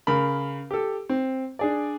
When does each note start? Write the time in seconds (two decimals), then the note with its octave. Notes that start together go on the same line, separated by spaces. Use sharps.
0.07 C#3 A#4 B5
0.71 G4 A4
1.09 C4
1.59 D4 G#4 D5